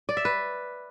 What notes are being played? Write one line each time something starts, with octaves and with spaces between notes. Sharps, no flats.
D5
E5
B4